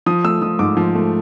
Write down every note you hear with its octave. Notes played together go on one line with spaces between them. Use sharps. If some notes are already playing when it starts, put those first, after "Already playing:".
F3 D#6
A3 E6
F3 D#6
G#2 D6
F3
A3